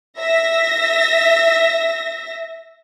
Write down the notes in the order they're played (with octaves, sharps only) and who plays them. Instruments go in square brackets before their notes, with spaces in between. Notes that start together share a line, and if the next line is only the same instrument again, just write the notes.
[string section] E5 A#6